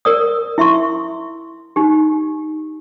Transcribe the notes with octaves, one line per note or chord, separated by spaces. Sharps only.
A#4 D5 D#6
E4 E5 C6 C#6
D#4 G4